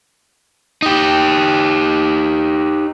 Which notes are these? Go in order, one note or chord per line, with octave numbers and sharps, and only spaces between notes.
D#4 G4